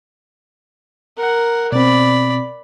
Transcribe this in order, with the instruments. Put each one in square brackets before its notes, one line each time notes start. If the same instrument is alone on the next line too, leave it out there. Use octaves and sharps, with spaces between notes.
[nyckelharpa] A#4 F#5
[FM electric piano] B2 C4 [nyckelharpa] D5 B5